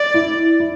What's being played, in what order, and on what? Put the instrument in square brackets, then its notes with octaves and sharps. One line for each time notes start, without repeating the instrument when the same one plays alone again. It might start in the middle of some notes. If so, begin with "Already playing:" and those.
Already playing: [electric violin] D5
[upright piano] E4
E4